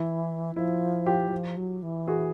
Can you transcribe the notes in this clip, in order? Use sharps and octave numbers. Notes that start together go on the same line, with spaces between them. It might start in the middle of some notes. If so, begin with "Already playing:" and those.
Already playing: E3 E4
F3 E4
F4 G4
F#3
F3
F#3
E3
F#4 G#4